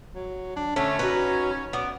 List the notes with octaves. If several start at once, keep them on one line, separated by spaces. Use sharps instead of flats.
F#3
D4
D3 A3 C#4
F#3 D#4 B4
B3 D5